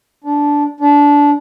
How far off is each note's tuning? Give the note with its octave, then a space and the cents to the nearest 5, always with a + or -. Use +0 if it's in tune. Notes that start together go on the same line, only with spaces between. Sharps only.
D4 -15
D4 -20